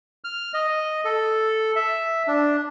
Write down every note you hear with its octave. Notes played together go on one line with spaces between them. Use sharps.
F6
D#5
A4
E5
D4